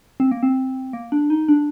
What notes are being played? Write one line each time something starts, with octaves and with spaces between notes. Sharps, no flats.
C4
A#3
C4
A#3
D4
D#4
D4